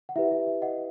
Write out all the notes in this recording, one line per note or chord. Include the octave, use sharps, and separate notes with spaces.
F#5
E4 G4 B4 E5
E5
E5
D#5 F#5